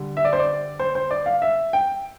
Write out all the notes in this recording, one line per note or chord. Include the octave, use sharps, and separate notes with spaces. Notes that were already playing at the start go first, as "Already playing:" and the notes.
Already playing: D3 G3
E5
D5
C5
D5
C5
C5
D5
F5
E5
G5